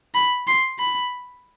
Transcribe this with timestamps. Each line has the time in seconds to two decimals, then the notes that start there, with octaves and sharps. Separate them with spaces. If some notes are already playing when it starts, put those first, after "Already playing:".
0.15 B5
0.47 C6
0.79 B5